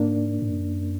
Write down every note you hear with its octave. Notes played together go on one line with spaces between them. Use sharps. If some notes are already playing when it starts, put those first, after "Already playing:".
Already playing: G#2 A#3 D4
G#2
F#2